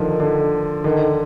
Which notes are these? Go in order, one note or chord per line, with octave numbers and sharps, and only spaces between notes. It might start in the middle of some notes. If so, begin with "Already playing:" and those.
Already playing: D3 D#3 F3
D3
D3 D#3